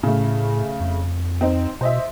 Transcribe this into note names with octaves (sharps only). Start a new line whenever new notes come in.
A2 C#3 A3
F2
C4 D#4
B2 C5 D#5 E5